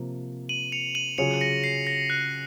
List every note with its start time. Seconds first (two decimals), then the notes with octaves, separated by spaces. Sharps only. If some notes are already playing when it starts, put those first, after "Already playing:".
Already playing: C3 F3 A#3
0.49 D#7 F#7
0.72 C#7 F7
0.95 D#7 F#7
1.18 C#3 F#3 C#4 F4 G#4 C#7 F7
1.41 A#6 C#7
1.64 C7
1.87 A#6
2.10 F#6